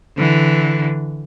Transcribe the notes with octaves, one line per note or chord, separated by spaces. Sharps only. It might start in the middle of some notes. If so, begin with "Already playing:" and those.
D3 E3